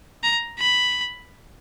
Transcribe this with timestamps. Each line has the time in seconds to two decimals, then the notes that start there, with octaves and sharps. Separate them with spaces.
0.23 A#5
0.60 B5